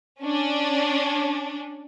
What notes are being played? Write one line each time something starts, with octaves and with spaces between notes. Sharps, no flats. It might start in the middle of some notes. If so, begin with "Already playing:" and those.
C#4 D4